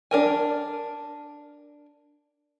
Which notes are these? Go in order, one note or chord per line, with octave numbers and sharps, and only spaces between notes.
D4 A#4 G#5